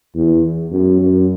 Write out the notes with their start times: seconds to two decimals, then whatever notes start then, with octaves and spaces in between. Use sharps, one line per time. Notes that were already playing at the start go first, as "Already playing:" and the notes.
0.15 E2
0.72 F#2
1.00 F#2